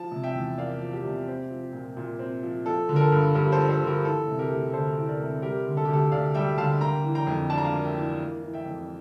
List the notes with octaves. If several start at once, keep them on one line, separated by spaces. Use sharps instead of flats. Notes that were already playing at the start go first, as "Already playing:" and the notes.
Already playing: F3 A5
C3
E5 G5
E2
A#3 D5 F5
F3
G4
C3
C4
F3
A#2
A#2
C4
F3
F3 A4
D3
A#4
A4
G2
G2 G4 A#4
A4 C5
F3
A4 C5
D3
G4 A#4
E3 A4
C3
G4 A#4
D2
D2 A4 C5
E3
A#4 D5
C3
G3 G4 A#4
D3
A4
G4
D2 A4
D2 D5 F5
G3 E5 G5
D3 F5 A5
A#3 G5 A#5
E3
G5 A#5
F2
D4 A5
A#5
F5 A5
A#3
E5 G5
E3
A#3
E3
E5 G5
F2